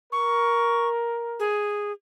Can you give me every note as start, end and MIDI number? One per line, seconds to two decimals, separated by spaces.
0.12 1.50 70
0.12 0.89 85
1.40 1.92 68